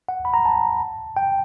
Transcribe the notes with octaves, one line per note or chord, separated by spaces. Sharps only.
F#5
B5
A#5
A5
G5